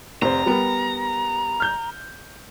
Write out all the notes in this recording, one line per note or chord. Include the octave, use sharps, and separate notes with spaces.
F1 C3 C5 A#5
G3 B3 A#4
F6 G6